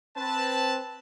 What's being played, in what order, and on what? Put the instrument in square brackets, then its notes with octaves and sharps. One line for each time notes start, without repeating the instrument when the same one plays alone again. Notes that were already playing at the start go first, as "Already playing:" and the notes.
[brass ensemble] C4 B4 A5